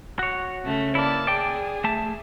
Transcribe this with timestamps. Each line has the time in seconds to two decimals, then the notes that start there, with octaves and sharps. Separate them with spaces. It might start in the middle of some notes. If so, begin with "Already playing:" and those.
0.19 F#4 C#5
0.64 C#3 A3 C#4
0.95 A#3 E4 D5 A5
1.27 G#4 D5 G5
1.84 A3 E5 A5